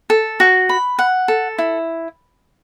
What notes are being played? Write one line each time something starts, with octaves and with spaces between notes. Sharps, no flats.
A4
F#4
B5
F#5
A4
E4